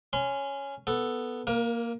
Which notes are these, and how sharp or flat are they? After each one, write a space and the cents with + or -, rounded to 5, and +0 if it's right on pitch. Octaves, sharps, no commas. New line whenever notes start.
C#4 +0 C6 -40
B3 +0 A4 +0
A#3 +0 A#4 +35